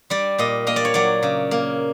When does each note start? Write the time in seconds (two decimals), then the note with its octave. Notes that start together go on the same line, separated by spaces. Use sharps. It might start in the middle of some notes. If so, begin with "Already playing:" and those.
0.10 G3 D5
0.38 A#2 D#5
0.67 A#3 D#5
0.76 D5
0.85 C#5
0.94 F#3 D5
1.23 C#3
1.51 A#3